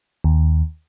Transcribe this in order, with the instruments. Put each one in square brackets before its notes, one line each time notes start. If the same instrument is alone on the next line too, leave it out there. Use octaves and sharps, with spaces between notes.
[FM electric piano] D#2